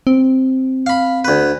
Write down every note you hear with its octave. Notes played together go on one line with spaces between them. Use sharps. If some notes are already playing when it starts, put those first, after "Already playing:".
C4
F5 B5
D2 B4